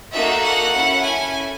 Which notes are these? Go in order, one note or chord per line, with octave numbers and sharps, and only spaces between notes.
A#3 D#4 F#4 A4 E5
F#5
C#4 E4 A4
G#5